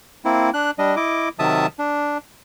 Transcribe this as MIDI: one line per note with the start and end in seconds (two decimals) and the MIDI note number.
0.25 0.50 58
0.25 0.50 60
0.25 0.50 64
0.54 0.71 62
0.54 0.71 90
0.79 0.95 55
0.79 0.95 62
0.79 0.95 75
0.96 1.29 64
0.96 1.29 75
0.96 1.29 86
1.39 1.66 48
1.39 1.66 51
1.39 1.66 54
1.39 1.66 76
1.39 1.66 81
1.39 1.66 87
1.79 2.18 62